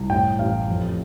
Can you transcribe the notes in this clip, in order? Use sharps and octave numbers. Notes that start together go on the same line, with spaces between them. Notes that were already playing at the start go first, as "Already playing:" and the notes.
Already playing: C2
A2 G5
A1 F5
F2